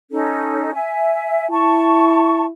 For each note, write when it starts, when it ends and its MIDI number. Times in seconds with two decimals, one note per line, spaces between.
0.11 0.73 61
0.11 0.73 63
0.11 0.73 69
0.73 1.49 76
0.73 1.49 80
1.50 2.49 64
1.50 2.44 81
1.50 2.44 85